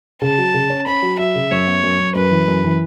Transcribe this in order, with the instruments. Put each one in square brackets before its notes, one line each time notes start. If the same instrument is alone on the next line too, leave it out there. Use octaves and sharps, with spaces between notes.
[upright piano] C#3 [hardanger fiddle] A5
[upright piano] F#3
C#3
C#4
[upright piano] C#4 [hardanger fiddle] B5
[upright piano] F#3
[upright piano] F#3 [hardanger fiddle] E5
[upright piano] C#3
[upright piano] F#2 [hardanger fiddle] C#5
[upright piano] B3
F#2
F#2
[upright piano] F#2 [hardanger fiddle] B4
[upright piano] E3
F#2
E3